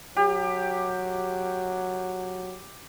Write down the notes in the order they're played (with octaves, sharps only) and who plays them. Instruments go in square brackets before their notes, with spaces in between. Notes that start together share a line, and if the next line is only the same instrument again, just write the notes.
[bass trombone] F#3 [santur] G4